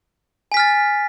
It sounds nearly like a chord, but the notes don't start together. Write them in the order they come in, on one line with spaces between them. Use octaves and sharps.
G#5 B6 F6 A6